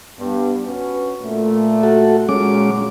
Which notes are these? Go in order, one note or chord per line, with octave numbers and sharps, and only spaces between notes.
G2 B3
C#4 F#4 B4
A#2 A3
F#4 A4
A#2 G#3 C#4 F#4 D6